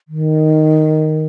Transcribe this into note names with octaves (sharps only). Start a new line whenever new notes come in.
D#3